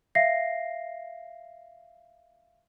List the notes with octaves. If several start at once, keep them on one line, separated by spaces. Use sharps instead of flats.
E5 F5 A#6 C7